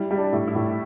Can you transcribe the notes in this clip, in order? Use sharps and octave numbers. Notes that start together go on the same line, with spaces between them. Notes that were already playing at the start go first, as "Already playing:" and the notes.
Already playing: G3 E4
G3
D4
A2
E4
A2